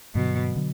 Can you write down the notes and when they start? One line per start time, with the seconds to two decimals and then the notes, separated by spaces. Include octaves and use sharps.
0.15 G2 B2 D3 F#3
0.56 D3 F#3